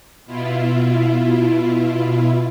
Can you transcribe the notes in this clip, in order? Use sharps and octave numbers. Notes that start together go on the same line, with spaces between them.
B2 E4 F4